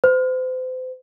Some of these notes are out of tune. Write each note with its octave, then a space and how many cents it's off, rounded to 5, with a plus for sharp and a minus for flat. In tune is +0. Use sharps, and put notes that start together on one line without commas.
C5 -35